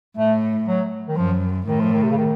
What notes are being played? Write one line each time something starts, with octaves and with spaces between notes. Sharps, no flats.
A2 A3
F#3
D#3
F#2 F3
A2 D#3
F3
D#3
C3
C#3
D#3